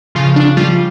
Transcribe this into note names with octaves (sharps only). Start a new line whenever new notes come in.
C#3 F3 F4
D4
F3 G3 F4